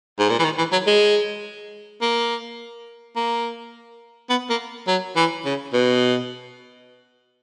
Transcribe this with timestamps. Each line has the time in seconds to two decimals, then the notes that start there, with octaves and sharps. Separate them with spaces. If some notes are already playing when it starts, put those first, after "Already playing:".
0.19 G#2
0.30 A#2
0.39 E3
0.44 D#3
0.58 E3
0.72 F#3
0.87 G#3
2.02 A#3
3.16 A#3
4.30 B3
4.50 A#3
4.87 F#3
5.16 E3
5.45 C#3
5.73 B2